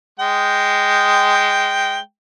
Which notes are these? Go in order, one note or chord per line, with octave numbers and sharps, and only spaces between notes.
G#3 G5